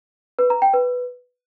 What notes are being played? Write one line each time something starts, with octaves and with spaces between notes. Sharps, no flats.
B4
A#5
G5
B4